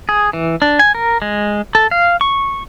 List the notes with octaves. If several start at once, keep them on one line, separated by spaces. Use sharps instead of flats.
G#4
E3
D4
G#5
A#4
G#3
A4
F5
C#6